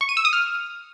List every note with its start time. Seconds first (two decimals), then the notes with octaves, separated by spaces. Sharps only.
0.01 C#6
0.09 D#7
0.17 E6
0.25 D#6
0.33 F6